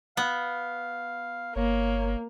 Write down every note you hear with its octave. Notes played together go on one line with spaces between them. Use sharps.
B3 F5
G1 A#3 C#5